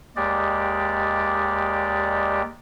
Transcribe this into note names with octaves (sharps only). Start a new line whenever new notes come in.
D#2 G#3 G4 D5